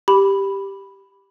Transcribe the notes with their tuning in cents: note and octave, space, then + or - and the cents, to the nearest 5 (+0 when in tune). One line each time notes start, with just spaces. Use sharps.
G4 +0 B5 +0